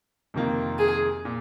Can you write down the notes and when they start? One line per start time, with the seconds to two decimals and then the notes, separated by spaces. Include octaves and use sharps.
0.34 F2 C3 D#3 A#3 F4
0.79 G#4
1.25 A#2